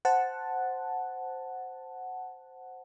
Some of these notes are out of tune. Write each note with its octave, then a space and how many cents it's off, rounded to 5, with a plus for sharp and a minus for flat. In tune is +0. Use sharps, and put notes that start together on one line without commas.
C5 +0 F#5 +0 A5 +0